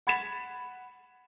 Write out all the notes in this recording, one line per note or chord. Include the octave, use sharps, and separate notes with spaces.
F#5 B5 G#6 A6 B6 E7